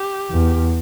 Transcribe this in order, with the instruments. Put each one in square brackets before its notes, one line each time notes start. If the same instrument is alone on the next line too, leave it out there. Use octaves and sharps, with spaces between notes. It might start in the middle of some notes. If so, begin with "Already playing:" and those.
Already playing: [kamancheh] G4
[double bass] E2